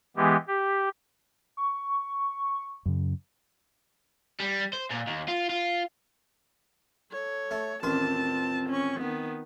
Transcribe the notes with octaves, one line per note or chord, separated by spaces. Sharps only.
E3 G#3 B3 G4
G4
C#6
F#2 C#3
G3
C5
A#2
D#2
F4
F4
A4 C#5
A3
A1 D#2 C4 F4 C5 A5
C#4 C#6
D#3 B3